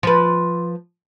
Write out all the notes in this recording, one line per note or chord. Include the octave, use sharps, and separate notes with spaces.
F3 B4